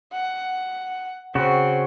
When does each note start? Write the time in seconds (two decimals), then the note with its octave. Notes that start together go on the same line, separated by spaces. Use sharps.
0.13 F#5
1.35 C#3 C4 F#4